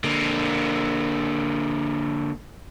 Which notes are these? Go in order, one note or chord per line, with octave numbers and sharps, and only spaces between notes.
D3 A#3